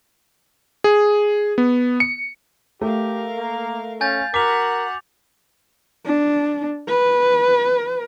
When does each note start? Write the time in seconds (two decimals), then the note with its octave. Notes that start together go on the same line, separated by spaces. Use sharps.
0.84 G#4
1.58 B3
2.00 C#7
2.81 A3 G4 A#4 F5
3.38 A#3
4.01 C#4 F5 G#5 G6 A6
4.34 F#4 A#4 F#5 D6 B6 F7
6.06 D4
6.89 B4